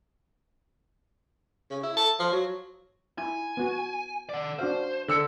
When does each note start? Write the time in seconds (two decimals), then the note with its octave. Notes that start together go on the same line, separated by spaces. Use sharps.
1.71 C#3
1.83 E4
1.97 A4
2.19 F3
2.32 F#3
3.18 E4 G#5
3.57 B3 F#4
4.29 D5 F#5
4.59 D4 F#4 C5 F5
5.08 D3 E6 C#7